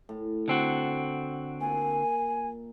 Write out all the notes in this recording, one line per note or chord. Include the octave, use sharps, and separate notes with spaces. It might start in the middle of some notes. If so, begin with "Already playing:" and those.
A2
D3 C4 F#4
A#2 G#5